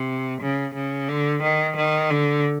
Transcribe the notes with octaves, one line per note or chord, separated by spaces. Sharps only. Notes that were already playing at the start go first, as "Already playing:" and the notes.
Already playing: C3
C#3
C#3
D3
D#3
D#3
D3